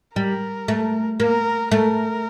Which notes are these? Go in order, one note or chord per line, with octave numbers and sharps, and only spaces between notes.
G3 A#4
A3
A#3 A#4
A3 A#4